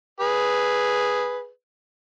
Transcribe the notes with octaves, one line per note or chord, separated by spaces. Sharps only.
G#4 B4